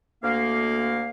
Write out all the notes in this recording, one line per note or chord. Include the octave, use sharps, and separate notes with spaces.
D2 A#3 F5